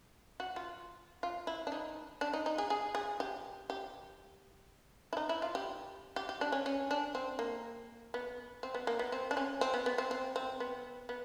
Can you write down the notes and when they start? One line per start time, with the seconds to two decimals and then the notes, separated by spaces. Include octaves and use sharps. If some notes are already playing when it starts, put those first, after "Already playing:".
0.40 F#4
0.56 F4
1.23 F4
1.47 E4
1.67 D4
1.72 D#4
2.21 D4
2.33 D#4
2.46 D#4
2.58 G#4
2.70 G#4
2.95 G#4
3.20 G4
3.70 G4
5.13 E4
5.17 D#4
5.29 E4
5.42 F4
5.55 G4
6.16 G4
6.29 G4
6.41 D4
6.52 C#4
6.66 C#4
6.91 D4
7.15 C4
7.39 A#3
8.14 B3
8.63 C4
8.75 B3
8.87 A#3
8.99 B3
9.12 C4
9.31 D4
9.37 C#4
9.61 C4
9.74 B3
9.86 B3
9.98 C4
10.11 C4
10.36 C4
10.60 B3
11.09 B3